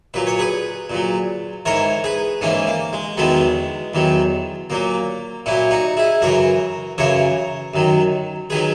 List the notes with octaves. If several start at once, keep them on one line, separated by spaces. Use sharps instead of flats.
A#2 F#3 B4
C#5
G#4 B4
A#2 F#3
G#2 E3 A#4 C#5
G#4 B4
G#2 E3 A#3 C#4
A#3
G#3
E2 D#3 F#3 G#3 B3
E2 D#3 F#3
A#2 F#3 A#3
A#2 F#3 C#4 E4
D#4 F#4
E4 G#4
F#2 C#3 E3 F#4 A#4
F#2 C#3 E3 A#4 C#5
F#2 D#3 F#3
D#3 F#3 G#4 B4